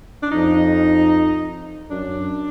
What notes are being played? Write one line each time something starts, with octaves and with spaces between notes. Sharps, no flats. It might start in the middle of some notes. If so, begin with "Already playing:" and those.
D4
F2 D#4
F#2 D4